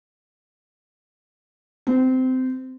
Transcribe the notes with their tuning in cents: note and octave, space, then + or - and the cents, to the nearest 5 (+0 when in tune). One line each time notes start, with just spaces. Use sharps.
C4 -20